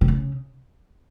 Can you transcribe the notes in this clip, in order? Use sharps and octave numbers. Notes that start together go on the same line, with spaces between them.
C3
C#3